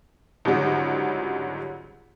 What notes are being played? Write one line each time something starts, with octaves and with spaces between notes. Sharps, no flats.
C#2 G#2 D3 F#3 G3